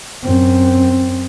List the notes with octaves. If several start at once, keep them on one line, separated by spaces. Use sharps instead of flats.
F#2 C4